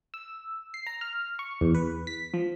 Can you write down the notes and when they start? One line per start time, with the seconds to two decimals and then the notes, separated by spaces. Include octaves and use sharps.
0.14 E6
0.74 C7
0.87 A#5
1.01 F6
1.39 C#6
1.61 E2
1.75 B4
2.07 B6
2.34 F3